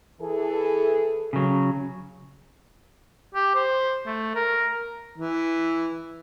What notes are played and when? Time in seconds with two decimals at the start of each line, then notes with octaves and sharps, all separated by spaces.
0.22 E3 G#4 A4
1.33 C#3 F#3
3.35 G4
3.55 C5
4.06 A3
4.35 A#4
5.18 E3